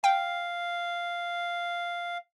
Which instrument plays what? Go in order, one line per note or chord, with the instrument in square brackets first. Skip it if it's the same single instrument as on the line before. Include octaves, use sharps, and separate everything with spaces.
[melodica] F5 [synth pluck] G5